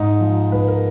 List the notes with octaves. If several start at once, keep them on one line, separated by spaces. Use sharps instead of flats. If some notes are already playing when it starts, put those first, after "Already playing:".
Already playing: G#2 D#4
F3
G#2 B4
A#4